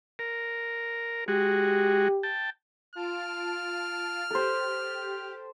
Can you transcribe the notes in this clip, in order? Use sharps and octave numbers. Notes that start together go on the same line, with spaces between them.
A#4
G#3 F#4 G4
G5 A5
F4 A5 F6 D7
G4 A4 C5